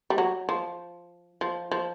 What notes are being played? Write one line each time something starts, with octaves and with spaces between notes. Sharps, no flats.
G3
F#3
F3
F3
F3